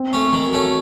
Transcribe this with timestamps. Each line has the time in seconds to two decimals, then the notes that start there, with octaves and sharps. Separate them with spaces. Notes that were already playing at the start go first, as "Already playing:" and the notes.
Already playing: C4
0.13 A3 C#4
0.33 D#3
0.46 F#4
0.53 A3 C#4